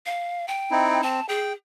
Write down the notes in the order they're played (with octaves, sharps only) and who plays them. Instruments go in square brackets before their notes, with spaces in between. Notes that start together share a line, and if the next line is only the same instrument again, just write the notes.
[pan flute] F5
G5
[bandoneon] C4 D#4 E4
[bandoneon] C4 [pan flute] A5
[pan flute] G#4 [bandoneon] G5